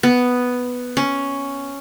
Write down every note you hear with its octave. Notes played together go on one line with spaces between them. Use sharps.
B3
C#4